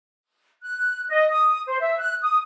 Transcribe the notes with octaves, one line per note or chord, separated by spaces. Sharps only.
F#6
D#5
D#6
C5
E5
F#6
D#6